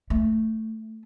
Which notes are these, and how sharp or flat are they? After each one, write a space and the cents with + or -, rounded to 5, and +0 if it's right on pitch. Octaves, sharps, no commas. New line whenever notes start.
A3 +5